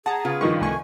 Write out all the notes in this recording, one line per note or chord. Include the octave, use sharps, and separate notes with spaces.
G#4 F#5 A5 A#5
C#3 F4 B4
G2 D#3 F3 C#6
C2 A3 G#5 C#6